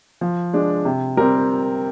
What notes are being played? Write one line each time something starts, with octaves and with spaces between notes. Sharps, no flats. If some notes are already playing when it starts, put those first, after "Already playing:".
F3
G#3 D4
C3
G3 C4 A#4